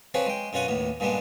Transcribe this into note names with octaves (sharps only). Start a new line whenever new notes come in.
F3 C4 G#4 B4 C#5
G#3 G5
F#2 B2 C#4 F4 F#5 G#5
D#2 A2 B3
G2 A#2 G3 G#3 B3 D4